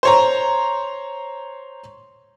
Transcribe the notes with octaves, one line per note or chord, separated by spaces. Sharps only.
C5 C#5 A#5